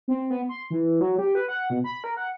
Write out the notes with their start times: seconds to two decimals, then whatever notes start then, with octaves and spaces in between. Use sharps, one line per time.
0.08 C4
0.30 B3
0.49 C6
0.70 E3
1.00 F#3
1.18 G4
1.35 B4
1.48 F#5
1.70 B2
1.84 B5
2.04 A#4
2.17 F#5